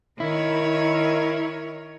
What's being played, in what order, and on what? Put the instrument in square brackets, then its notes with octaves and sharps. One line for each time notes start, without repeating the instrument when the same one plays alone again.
[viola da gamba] D#3 A#4 C#5 [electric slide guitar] E4